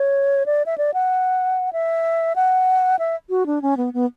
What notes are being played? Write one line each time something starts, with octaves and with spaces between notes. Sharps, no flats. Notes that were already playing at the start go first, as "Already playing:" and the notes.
Already playing: C#5
D5
E5
D5
F#5
E5
F#5
E5
F#4
D4
C#4
B3
B3